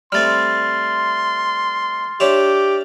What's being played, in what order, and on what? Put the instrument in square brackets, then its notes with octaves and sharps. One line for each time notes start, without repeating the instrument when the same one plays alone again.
[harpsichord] G3 A3 C4 [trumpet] C6 [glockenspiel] F6 A6
[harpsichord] D4 C#5 E5 [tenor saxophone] G4 [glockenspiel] F7